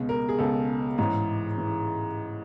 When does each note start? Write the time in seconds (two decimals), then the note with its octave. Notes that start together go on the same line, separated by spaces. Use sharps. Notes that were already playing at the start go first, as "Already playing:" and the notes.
Already playing: C#2 B2 G#3
0.09 A#4
0.29 G#4
0.39 C#2 B2 G#3 A4
0.98 A1 G#2 E3
1.58 E3